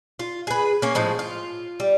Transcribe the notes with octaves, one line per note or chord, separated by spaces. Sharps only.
F4
G#4 B4
A#3 C#4
A2 F3 G#3
F4
G3